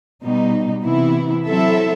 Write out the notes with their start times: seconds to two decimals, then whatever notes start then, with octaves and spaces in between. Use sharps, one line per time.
0.24 B2 G3 D#4
0.84 C3 E3 B3 E4
1.45 F#3 C4 E4 A4 E5